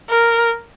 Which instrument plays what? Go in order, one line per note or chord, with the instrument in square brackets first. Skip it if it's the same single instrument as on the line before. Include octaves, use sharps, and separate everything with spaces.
[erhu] A#4